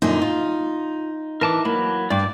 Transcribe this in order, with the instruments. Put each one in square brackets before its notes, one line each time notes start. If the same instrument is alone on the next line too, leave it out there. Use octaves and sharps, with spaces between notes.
[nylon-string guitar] F#2 A#2 D3 [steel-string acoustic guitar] D#4
[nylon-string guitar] F4
[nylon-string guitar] E3 [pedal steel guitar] A#4 A5 D6
[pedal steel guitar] F#3 B5 [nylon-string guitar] A#3
[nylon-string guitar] G2 [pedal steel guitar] D5 D6